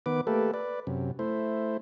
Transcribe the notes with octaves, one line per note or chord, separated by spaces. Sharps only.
D#3 B3 B4 D6
A3 A#3 G4 A4 B4
B4 D5
F#2 C3
A3 E4 C5